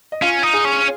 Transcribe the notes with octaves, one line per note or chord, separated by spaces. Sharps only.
D#5
C#4 F4 F5
D#4
G#4 G#5
C#4